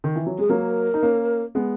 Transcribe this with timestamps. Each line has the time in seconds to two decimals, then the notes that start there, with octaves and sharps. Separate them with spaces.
0.04 D#3
0.16 E3
0.27 F#3
0.38 G#3 G#4
0.49 F#3 A#3 A#4
0.94 D#4
1.03 A#3 C#4
1.55 G#3 B3